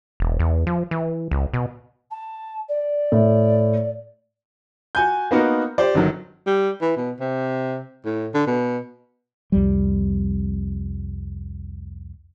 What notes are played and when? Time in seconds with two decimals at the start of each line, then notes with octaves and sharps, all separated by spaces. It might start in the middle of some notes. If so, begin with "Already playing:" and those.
0.20 E1
0.39 E2
0.67 F3
0.91 E3
1.31 C#2
1.53 B2
2.11 A5
2.68 D5
3.12 A2
4.95 F#4 G#5 G6
5.31 A#3 B3 D#4 F#4 A#4
5.78 G4 C5 D5
5.95 G1 D#3 F#3
6.47 G3
6.81 E3
6.97 B2
7.20 C3
8.06 A2
8.34 D3
8.47 B2
9.52 C2 F2 G3